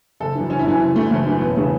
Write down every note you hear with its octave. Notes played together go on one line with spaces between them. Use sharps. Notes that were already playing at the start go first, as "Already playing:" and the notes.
F#1 A4
F#2 E3
F#1 C#4
E4
F#2 E3 C#4
F#1
F#2 E3 A3
F#1 A3
F#2 E3
E1 B3
C#3 E3 A3